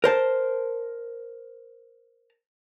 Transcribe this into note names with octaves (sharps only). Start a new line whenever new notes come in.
A#4 C5 A5